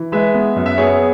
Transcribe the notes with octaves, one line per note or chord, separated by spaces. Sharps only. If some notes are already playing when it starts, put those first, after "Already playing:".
Already playing: E3
G#3 B4 E5
B3
F#2
E5
B3 G#4 C#5